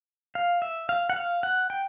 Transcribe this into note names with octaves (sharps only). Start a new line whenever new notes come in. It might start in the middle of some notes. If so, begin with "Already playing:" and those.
F5
E5
F5
F#5
F5
F#5
G5